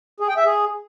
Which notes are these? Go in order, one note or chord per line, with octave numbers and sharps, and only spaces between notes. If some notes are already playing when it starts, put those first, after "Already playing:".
G#4
G5
E5
G#4